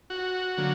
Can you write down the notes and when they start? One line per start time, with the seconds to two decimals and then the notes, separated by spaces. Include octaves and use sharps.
0.10 F#4
0.58 D3 F#3 A#3